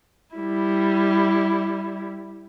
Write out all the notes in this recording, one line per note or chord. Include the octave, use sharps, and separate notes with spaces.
G3 E4